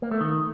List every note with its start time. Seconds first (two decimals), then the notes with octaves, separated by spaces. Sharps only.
0.02 A#3
0.11 A3
0.21 D#3